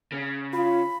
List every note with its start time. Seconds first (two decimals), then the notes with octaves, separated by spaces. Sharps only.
0.12 C#3
0.53 F4 B5